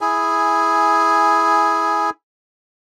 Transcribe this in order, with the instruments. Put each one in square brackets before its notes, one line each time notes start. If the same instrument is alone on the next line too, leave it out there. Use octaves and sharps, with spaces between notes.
[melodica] E4 G#4 G#5